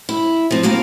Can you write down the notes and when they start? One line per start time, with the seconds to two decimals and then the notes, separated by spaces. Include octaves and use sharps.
0.09 E4
0.51 F3 C4
0.63 A2 A#3 A#4 F5